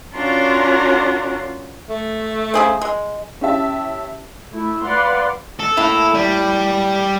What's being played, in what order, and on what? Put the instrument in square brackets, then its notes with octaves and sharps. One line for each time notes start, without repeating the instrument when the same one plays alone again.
[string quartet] C#4 D4 F4 F#4 A#4 C#5
[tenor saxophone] A3
[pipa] C#3 G#4 C5
G#3
[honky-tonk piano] C#4 E4 G4 E5 A5
[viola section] A3 E4
B4 D5 F5 F#5 C6
[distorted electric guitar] A4
[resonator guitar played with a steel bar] A2 A#3 E4
[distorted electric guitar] G3